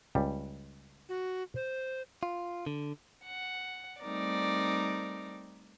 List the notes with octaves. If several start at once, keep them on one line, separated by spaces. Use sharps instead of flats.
C#2 G3
F#4
C5
F4
D3
F#5
G3 A3 C4 D#4 A#4 D5